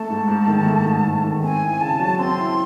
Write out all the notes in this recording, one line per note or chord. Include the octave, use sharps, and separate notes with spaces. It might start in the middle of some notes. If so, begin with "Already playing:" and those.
Already playing: A3 A5
G#2
G#2
D#3
A3
G#2
G#2
D#3
C4 G#5
E4
C#3 A5
F#3
C4 C6
E4